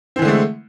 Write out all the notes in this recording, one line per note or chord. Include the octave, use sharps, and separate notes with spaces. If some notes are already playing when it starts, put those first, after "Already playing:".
D3 E3 G#3 A3 C4